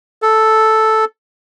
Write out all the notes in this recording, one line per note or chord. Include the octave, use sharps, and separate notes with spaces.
A4